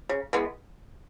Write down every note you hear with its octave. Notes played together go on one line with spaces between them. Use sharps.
C#3
E3 G#3 B3